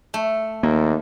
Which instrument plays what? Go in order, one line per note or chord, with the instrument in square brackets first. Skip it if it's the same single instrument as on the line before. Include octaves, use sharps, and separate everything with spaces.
[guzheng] A3
[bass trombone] D#2 [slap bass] A#3